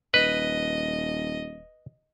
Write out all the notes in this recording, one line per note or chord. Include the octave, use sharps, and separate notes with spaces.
D#1 B4 D#5